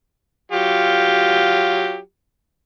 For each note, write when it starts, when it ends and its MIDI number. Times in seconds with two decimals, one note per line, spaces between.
0.52 1.98 54
0.52 1.98 65
0.52 1.98 67